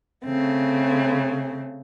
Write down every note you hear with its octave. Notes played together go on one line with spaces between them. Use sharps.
C#3 A3 C4